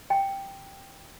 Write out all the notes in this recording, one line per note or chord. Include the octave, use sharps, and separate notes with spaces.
G5